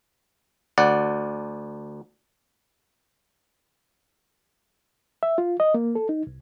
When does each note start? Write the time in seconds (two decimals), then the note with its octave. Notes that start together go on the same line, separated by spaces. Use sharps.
0.78 D2 D5 F#5
5.23 E5
5.38 F4
5.60 D#5
5.74 A#3
5.95 A4
6.09 D#4
6.27 C2